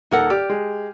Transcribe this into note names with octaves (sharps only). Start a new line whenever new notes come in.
D#1 A#3 D#4 A4 A#4 F#5
G4 D5 F6
G#3